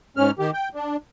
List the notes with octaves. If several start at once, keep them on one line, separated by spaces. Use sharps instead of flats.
G#2 C#4 F6
D#3 G4
G5
D4